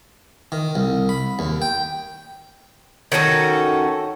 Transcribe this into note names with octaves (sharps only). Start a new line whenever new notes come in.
D#3
C2
B5
D#2
G5
D#3 C#4 F#4 A4